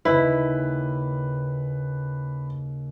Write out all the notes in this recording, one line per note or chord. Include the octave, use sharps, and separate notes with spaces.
D#2 C#3 E4 B4